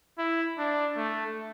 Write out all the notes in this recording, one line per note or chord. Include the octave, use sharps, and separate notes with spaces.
E4
D4
A3